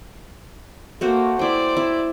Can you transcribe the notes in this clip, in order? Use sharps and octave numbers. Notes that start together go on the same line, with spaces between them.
A3 A#3 F#4 C5
E4 C5 D5 G5
E4